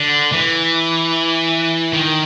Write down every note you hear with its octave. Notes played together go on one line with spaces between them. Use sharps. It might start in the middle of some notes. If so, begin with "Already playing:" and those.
Already playing: D3
E3
D#3